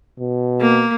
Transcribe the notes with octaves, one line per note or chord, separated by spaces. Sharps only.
B2
A#3